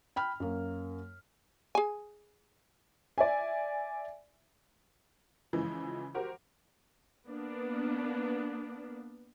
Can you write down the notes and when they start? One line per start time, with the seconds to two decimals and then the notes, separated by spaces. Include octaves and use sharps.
0.16 G5 B5 F6
0.40 F#2 A#3
1.75 G#4 G#5
3.18 D5 E5 G#5
5.53 C#3 E3 F3 G#3
6.14 F#4 G4 A#4 C5
7.28 A#3 B3 D4